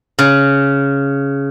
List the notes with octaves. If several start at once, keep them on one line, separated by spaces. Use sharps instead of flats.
C#3